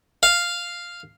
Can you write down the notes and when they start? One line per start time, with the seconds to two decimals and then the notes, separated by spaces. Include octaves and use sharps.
0.23 F5